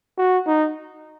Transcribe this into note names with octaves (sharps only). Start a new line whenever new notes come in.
F#4
D#4